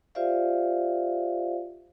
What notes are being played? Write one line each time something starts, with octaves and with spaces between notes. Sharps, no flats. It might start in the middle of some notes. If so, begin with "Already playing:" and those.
F4 G4 C5 D5 E5 F5